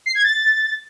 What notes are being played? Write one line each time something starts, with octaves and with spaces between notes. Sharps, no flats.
C7
G#6
A6